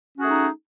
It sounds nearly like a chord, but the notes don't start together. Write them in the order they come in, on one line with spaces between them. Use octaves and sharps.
C#4 F#4 G#4 A3 D#4